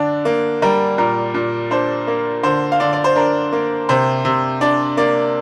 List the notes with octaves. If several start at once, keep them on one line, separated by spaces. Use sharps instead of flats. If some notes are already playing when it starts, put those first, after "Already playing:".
Already playing: D3 D4
A#3
G3 A#4
A#2 A#4
A#2
D4 C5
A#3
D3 C5
F5
D3 D5
D5
C5
D4 A#4
A#3
C3 C5
C3
D4 D5
A#3 D5